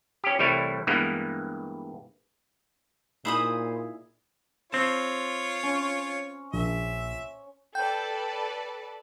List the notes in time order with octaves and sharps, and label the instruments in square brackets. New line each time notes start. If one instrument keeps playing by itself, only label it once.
[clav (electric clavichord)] C#4 G4
C2 E3 G3 A3 E4 C#5
G2 E3 G#3 A#3 B3
[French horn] A#2 [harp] D#4 E4 G#4 [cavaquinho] C5 B5 D#6
[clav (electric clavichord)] C4 A5 [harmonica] F4 C#5 [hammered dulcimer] C5
[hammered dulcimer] C#4
[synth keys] A#1 [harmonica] E5
[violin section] A4 B4 D5 [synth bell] G5 G6